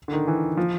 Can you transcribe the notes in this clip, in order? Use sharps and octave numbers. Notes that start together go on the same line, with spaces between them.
D3
D#3
E3
F3